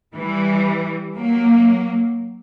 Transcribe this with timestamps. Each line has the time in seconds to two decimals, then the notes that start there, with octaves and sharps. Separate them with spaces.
0.17 E3 G3
1.17 F#3 A#3